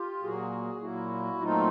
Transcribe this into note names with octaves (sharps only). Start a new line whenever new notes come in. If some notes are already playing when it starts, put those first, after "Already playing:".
Already playing: F4 G4
A#2 F#3 A#3 F#4 G#4
A#2 F#3 A#3 E4 F#4
A#2 F#3 A3 C4 D#4 F4